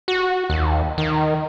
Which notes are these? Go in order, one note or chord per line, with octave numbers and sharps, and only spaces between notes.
F#4
D#2
D#3